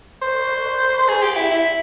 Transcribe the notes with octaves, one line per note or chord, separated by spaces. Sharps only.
C5
G#4
G4
E4
E4